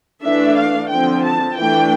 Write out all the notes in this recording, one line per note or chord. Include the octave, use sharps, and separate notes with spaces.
E3 A3 D4 E5
F5
D3 F3 C4 G5
A5
E3 A3 D4 G5